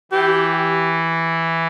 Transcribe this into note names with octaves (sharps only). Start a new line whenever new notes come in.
E3 G4